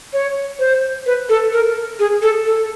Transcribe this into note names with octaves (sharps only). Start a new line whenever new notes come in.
C#5
C5
B4
A4
A#4
G#4
A4
A4